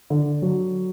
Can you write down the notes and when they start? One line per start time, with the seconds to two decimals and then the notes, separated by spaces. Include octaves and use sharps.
0.10 D3
0.42 F#3